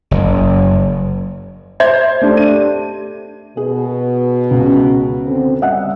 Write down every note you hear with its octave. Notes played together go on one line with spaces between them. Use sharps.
F#1
C5 E5 G6 G#6
A3 D4 G4
D#7
B2 G#4
C#2 C#3
D3 C4
G3 D#5 E5 F#5